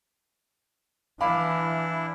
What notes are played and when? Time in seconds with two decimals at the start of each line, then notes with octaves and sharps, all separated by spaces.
1.21 E3 D4 E4 F5 B5 D6